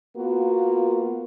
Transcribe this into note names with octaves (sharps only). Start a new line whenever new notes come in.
A#3 B3 F4 F#4